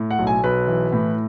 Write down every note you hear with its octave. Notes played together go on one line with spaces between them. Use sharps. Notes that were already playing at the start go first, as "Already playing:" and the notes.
Already playing: A2
F#5
B1
G#5
B1 B4
E3
A2